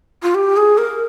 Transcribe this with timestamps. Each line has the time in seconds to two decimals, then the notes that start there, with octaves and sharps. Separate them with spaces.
0.23 F4
0.34 G4
0.57 G#4
0.78 A#4